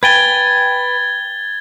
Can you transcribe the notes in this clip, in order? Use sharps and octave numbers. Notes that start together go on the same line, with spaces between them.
B4 G5 G#5 G#6 A6 G7